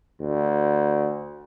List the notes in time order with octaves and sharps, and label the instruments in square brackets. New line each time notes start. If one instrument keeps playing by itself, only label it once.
[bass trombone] D2